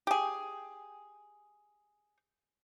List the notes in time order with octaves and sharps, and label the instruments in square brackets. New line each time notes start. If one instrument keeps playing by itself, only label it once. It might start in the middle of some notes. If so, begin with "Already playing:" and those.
[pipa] G4 G#4